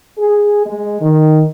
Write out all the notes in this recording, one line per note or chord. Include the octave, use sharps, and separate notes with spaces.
G#4
G#3
D#3